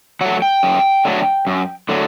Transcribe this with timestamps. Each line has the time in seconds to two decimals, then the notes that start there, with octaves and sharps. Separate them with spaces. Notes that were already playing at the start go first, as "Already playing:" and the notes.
0.21 F#3 A3 F#5
0.42 G5
0.63 F#2
1.05 D3 F#3 A3
1.47 F#2
1.89 D3 F#3 A3